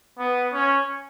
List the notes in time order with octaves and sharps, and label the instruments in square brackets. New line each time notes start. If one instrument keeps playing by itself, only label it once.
[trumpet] B3
C#4